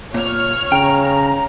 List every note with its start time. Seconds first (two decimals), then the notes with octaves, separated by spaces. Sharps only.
0.14 A#2 C#5 F6
0.72 C#3 G5 A#5